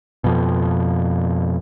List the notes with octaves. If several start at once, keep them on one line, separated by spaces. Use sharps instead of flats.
F2 B2